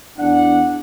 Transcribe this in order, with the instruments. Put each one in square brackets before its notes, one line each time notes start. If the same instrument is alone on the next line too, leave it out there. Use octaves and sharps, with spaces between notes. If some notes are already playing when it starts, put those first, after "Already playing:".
[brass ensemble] E2 D4 F#5